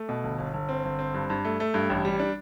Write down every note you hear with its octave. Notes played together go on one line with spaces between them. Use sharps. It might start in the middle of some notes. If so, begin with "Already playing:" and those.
Already playing: A3
B2
G1
G1
G1
C4
G1
C4
G2
G2
A3
A3
G2
A1
G3
D4